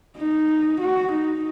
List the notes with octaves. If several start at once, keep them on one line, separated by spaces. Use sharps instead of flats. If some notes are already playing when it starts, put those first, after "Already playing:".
D#4
F#4
D#4